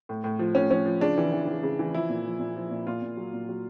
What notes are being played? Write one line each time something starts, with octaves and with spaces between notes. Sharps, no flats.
A2
A2
F3
A2 C#4
F3 C#4
F3
C#3 D4
E3
E3
E3
C#3
E3
F3 E4
A#2
F3
A#2
F3
A#2
A#2 F4
A#2
F#3
A#2
F#3